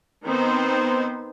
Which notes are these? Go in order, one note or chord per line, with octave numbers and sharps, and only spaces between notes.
D#3 B3 C4 D#4 C5